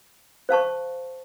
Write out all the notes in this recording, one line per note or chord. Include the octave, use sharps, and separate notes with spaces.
C5 F5 A5 C#6